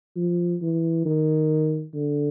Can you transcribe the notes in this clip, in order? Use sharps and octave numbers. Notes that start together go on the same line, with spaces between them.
F3
E3
D#3
D3